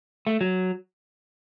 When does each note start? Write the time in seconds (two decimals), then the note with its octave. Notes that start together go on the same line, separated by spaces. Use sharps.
0.27 A3
0.41 F#3